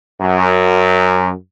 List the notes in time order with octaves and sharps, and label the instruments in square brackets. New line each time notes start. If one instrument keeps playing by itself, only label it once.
[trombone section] F#2